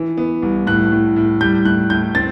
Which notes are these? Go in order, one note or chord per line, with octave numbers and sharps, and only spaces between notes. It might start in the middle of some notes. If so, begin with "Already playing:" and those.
Already playing: E3
B3
C2
A2 F#6
A2
A2
G3 G6
A2 F#6
A2 G6
C4 A6